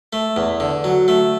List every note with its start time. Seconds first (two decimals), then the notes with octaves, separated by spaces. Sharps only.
0.13 A3
0.36 E2
0.60 D3
0.84 F#3
1.08 A3